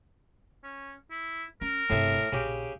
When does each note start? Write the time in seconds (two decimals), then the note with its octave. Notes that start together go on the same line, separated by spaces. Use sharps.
0.64 C#4
1.11 E4
1.61 C#4 A#4
1.90 G1 A2 C3 E5
2.33 A#1 C#3 G4